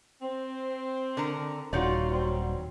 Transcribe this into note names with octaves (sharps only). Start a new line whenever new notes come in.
C4
D3 A#4 A#5
D#1 D#4 F4 F#4 C#5 D5
F#3 G3 C4